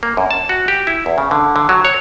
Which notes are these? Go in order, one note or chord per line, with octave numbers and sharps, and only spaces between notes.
A#3
F#2
A5
F#4
G4
E4
E2
C#3
D3
D3
F#3
C#5